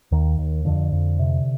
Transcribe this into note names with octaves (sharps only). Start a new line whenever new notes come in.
D#2 D#3
D#2
F2 D3
F2
C3